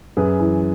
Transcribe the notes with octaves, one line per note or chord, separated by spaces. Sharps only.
F#2 G#4 B4
E3